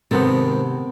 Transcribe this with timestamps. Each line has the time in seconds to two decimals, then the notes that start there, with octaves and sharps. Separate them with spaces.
0.11 G#2 C3 D#3 B3 C4 A4